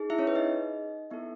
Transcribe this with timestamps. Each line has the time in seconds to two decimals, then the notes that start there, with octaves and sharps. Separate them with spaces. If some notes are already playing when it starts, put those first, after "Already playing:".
Already playing: D#4 G#4
0.10 E4 E5
0.19 C#4 C#5
0.27 B4
0.35 D#4 D#5
1.11 B3 D#4 E4 A4 E5